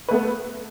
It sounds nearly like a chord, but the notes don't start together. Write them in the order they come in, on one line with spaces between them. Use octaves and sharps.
B4 A3 B3